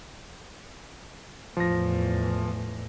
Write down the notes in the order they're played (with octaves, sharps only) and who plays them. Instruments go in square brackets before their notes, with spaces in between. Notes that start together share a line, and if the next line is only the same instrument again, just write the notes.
[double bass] E2 A2 [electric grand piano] F3 A#6